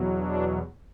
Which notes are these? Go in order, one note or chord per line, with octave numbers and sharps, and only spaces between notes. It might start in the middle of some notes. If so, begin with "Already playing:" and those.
Already playing: E2 B2 F#3
D4